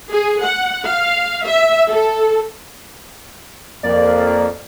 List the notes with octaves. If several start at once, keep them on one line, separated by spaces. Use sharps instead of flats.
G#4
F#5
F5
E5
A4
F2 A#3 D5